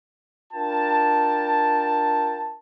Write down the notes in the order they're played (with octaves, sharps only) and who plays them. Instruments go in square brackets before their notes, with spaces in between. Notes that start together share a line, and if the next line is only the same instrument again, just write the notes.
[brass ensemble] D4 F4 A#4 G5 A5